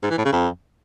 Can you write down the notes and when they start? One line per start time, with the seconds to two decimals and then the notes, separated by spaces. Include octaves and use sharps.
0.03 G#2
0.10 E3
0.18 A2
0.25 C#3
0.33 F2